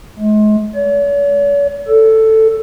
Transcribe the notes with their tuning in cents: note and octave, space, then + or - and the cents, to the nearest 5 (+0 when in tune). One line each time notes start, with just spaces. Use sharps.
G#3 +35
C#5 +45
A4 +5